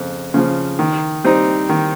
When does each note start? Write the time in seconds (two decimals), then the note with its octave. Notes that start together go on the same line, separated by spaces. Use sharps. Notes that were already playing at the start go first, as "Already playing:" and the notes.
Already playing: F2 C#3
0.34 C#3 F3
0.79 D#3
1.24 G3 C4 D#4
1.69 D#3